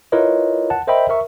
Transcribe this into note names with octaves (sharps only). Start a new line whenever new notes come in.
E4 F4 A#4 B4 C#5 D#5
F#5 A5
A#4 C5 D#5 E5 G5 B5
A#4 E5 C#6